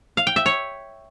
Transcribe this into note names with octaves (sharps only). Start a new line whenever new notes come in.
F5
G5
E5
C#5